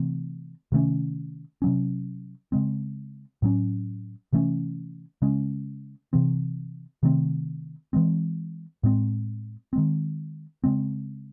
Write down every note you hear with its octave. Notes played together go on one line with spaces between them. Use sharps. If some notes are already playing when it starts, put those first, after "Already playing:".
Already playing: C3 E3 A3 C4
C3 D#3 A3 C#4
C3 F#3 C#4
C#3 G#3 C4
A2 F#3 C#4
C3 E3 A3 C#4
C#3 G#3 C#4
C3 E3 C4
C3 D#3 A3 C4
E3 G#3 C4
A2 G#3 C4
D#3 G#3 C4
C#3 G#3 C4